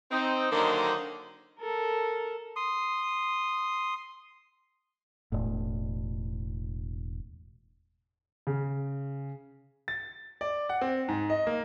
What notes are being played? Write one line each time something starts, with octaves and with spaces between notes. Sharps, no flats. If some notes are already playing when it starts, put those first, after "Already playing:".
C4 D#4
D3 D#3 F#3 A#3 D#4 C5
A4 A#4
C6 D#6
E1 A2
C#3
A6
D5
F#5
C4
G#2
D#5
A#3